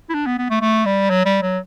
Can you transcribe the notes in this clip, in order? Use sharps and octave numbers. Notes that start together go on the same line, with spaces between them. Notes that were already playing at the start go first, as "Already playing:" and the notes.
E4
D4
B3
B3
A3
A3
G3
F#3
G3
F#3